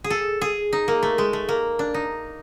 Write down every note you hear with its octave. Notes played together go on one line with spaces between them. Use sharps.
G#4
A4
G#4
D#4
A#3
A3
G#3
A3
A#3
D4
D#4